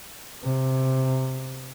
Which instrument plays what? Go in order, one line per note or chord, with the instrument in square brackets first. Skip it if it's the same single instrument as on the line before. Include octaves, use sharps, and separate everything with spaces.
[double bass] C3